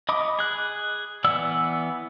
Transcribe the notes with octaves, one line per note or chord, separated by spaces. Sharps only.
D#5 B5 D6 D#6
G#4 F#6
E3 B3 D5 E6